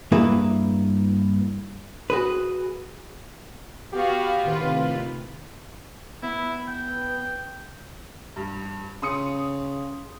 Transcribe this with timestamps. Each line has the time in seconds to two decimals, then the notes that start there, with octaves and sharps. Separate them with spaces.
0.12 G2 A#3 E4 G#4 B4 E5
2.10 F#4 G#4 B4
3.92 B3 F#4 G4 F5
4.42 A2 C3 D#3 F4 B4
6.23 B3 E4
6.68 G5
8.36 G2
9.02 C#3 C6 D#6 C#7